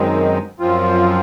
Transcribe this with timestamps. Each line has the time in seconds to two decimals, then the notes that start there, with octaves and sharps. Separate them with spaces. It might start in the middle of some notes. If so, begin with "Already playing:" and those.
Already playing: F#2 D#3 G#3 C4 D#4
0.60 F#2 F3 C4 F4